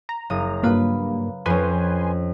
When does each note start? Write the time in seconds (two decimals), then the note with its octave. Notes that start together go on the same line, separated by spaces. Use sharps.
0.09 A#5
0.30 F#1 D#6
0.63 G2 A#3 F4 B4 B5
1.46 F2 C#4 B4 G#5 C6